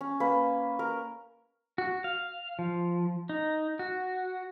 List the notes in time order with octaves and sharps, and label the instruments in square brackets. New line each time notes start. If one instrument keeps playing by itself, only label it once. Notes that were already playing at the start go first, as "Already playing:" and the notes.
[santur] C#4
A#3 B4
A#4
[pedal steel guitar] F#4
F5
F3
D#4
F#4